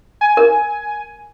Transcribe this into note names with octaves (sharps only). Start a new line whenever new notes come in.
G#5
A#4